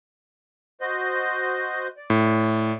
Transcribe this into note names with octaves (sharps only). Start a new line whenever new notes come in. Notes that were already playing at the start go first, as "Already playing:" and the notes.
F#4 C5 D#5
D5
A2